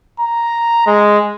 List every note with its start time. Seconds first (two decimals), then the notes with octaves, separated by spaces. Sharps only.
0.20 A#5
0.86 G#3